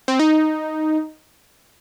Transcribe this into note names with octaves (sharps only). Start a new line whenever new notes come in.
C4
D#4